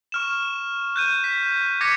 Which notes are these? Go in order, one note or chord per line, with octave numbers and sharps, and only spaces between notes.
C#6 F6 E7
F#6 G6 D#7
B6
D6 G#6 A#6 B6 C#7